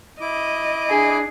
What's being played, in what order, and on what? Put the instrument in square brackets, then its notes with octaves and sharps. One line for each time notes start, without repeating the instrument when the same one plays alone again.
[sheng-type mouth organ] E4 D6 [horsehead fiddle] D#5
[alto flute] D4 [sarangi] G#4